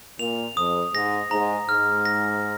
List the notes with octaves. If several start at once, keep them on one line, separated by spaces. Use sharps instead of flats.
A#2 F7
F2 D#6
G#2 A#6
G#2 A#5
G#2 F6
A#6